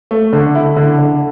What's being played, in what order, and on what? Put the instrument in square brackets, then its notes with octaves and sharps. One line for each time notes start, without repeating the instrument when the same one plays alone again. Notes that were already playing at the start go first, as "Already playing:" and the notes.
[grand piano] A3
D3
E4
D3
D3